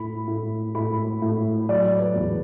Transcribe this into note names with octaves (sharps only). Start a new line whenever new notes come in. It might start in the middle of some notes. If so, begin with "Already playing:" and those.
Already playing: A2 B5
A2
A2 B5
A2
F#3 D5
B4
E2